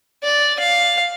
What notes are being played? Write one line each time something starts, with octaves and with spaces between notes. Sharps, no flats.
D5
F5